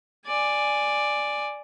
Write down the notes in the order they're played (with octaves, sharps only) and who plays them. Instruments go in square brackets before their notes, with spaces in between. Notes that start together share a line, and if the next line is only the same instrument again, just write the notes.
[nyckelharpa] D5 G#5